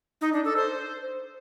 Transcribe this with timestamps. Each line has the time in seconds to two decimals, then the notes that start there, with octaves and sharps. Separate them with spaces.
0.21 D#4
0.33 D4
0.45 A4
0.56 C5